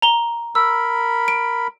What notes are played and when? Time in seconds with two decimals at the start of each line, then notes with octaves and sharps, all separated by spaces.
0.02 A#5 G7
0.55 A#4 B5 E6
1.28 D7